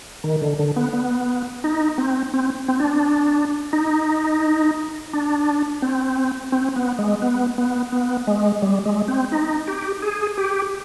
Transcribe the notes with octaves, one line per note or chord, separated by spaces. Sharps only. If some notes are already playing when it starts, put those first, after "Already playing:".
D#3
D3
D3
B3
B3
D#4
C4
C4
C4
D4
D#4
D4
C4
C4
B3
G#3
B3
B3
B3
G#3
G3
G#3
C4
D#4
G4
G#4
G4